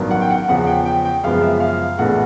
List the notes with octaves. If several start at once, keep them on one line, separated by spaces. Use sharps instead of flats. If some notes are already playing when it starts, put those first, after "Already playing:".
Already playing: A1 G2 D#3 F#3 B3
F#5
G5
F#5
E2 C#3 F3 F#5
G5
G5
G5
F#2 C#3 F3 G#3 B3 F5
E5
F5
A#1 A2 E3 G#3 B3 F#5